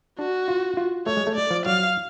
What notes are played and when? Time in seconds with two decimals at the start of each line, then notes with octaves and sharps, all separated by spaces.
0.19 D4 F#4
0.48 F4
0.77 F4
1.06 A3 C#5
1.17 G#3
1.27 A3
1.36 D5
1.51 F3
1.66 F#3 F5